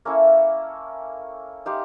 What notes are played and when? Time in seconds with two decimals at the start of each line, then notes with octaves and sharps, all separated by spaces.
0.05 A#3 C#4 E4 A4
1.66 D#4 G4 C5 F5